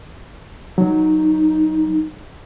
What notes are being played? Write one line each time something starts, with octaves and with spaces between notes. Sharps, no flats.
F#3 D#4